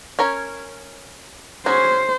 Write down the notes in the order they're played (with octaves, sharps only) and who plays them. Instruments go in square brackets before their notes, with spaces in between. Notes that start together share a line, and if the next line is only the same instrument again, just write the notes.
[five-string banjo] C#4 A#4 C#5
[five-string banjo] C#4 F#4 G#4 [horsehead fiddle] C5